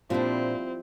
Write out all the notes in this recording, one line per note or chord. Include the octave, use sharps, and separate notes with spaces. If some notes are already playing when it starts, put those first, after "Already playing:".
A#2 F3 G3 C4 D4 E4